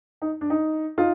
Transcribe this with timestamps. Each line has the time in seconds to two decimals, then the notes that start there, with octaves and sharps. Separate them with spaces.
0.22 D#4
0.41 D4
0.50 D#4
0.98 D#4 F4